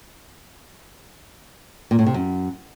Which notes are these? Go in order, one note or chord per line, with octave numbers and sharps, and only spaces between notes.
A#2
A2
C3
F#2